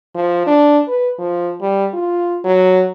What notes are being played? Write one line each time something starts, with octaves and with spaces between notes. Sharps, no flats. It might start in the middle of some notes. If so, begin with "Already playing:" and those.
F3
D4
B4
F3
G3
F4
F#3